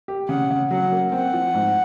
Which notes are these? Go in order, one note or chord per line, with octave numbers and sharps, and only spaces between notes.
G4
C#3 F#5
C#3
F#3 F#5
A#3
C4 F#5
F3
G#2